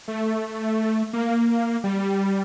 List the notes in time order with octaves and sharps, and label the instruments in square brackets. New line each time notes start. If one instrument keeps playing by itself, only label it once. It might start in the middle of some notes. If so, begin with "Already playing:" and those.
[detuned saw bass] A3
A#3
G3